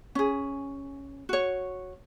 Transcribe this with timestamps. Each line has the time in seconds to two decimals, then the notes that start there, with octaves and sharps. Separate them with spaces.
0.15 C#4 G#4
1.29 F#4 C#5